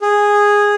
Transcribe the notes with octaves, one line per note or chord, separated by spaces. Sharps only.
G#4